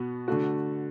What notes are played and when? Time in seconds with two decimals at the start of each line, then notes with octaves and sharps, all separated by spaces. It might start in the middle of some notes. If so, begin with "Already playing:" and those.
Already playing: B2 B3 F#4
0.28 D3 A3 F#4